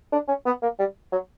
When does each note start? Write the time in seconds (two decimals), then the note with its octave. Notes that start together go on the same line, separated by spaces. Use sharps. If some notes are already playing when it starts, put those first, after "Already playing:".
0.12 D4
0.28 C#4
0.46 B3
0.62 A#3
0.79 G3
1.12 F#3